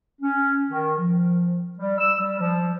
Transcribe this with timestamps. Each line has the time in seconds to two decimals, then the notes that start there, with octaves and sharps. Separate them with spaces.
0.21 C#4
0.71 D#3
0.99 F3
1.79 G3
1.98 E6
2.19 G3
2.40 F3